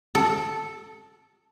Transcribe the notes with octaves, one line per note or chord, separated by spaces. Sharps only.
A4